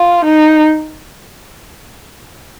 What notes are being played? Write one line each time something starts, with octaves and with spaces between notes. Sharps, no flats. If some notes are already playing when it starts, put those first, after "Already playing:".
Already playing: F4
D#4